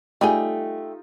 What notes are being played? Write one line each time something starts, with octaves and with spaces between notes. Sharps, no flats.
G3 A3 D#4 F4 G4 G#4 G5 G#5